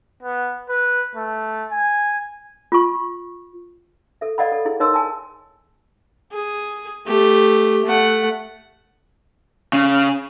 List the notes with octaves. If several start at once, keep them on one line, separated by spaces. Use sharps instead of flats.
B3
B4
A3
G#5
F4 C#6
A4 E5
A4 D5 D#5 F5 F#5 B5
A4
E4 G#4
D#4 A#4 C#5 D#5 C6 E6
G#5 A5
G#4
A3 G4
A3 F#5
C#3